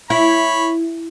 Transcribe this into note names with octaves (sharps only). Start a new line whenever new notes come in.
E4 C#5 B5